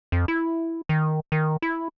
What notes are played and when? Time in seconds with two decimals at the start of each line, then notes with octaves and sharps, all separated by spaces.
0.12 F2
0.28 E4
0.89 D#3
1.32 D#3
1.62 E4